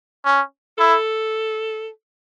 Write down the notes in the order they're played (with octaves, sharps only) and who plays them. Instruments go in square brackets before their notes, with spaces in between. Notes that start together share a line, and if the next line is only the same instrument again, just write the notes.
[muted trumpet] C#4
[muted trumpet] E4 [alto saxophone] A4